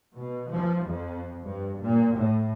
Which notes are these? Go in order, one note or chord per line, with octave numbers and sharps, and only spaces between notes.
B2
F3
F2
G2
A#2
A2